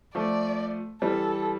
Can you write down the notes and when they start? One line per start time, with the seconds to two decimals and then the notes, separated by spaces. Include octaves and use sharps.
0.15 F3 A3 D5
1.02 E3 G3 A4